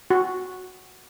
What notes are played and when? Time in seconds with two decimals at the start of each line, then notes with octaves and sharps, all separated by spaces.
0.10 F#4